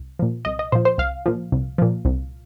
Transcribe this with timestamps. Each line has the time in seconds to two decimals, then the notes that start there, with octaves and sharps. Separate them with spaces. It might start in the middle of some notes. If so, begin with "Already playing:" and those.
Already playing: C2
0.19 A#2 F3
0.45 C2 D#5
0.59 D#5
0.72 A#2 F3 C5
0.85 C5
0.98 C2 F5
1.26 A#2 F3
1.52 C2
1.78 A#2 F3
2.05 C2